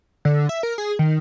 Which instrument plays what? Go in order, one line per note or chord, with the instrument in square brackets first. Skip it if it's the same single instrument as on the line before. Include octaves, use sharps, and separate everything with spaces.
[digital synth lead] D3
E5
A#4
G#4
D#3